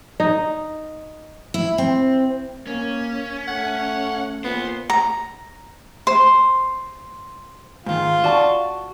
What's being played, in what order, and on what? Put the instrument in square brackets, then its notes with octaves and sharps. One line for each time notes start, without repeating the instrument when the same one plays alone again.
[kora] D#4
[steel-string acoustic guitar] E4
C4
[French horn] A#3 [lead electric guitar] C#4
[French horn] A3 [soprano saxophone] F#5
[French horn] A#2 [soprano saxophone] B3 [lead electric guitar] C5
[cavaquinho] A#5
C5
[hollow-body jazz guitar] G#2 D#3 [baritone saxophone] F4
[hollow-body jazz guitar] F#4 [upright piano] D5 A5 C#6